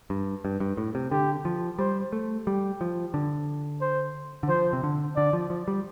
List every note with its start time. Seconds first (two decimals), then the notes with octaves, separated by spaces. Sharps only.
0.10 G2
0.45 G2
0.60 G2
0.77 A2
0.95 C3
1.11 D3 G4
1.45 F3
1.79 G3 C5
2.13 A3
2.47 G3 G4
2.81 F3
3.14 D3
3.81 C5
4.43 D3
4.49 F3 C5
4.73 C3
4.83 D3
5.16 D3 D5
5.33 F3
5.50 F3
5.68 G3